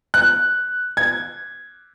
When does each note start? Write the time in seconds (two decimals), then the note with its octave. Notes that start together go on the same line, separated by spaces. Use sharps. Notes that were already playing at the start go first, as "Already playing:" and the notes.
0.14 F#6
0.97 G#6